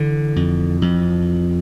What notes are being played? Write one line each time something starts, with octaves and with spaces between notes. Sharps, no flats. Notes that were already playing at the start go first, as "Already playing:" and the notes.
Already playing: D3 E3
F2
F2